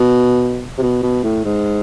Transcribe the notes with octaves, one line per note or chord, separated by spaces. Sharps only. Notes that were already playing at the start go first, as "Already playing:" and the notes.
Already playing: B2
C3
B2
B2
A2
G#2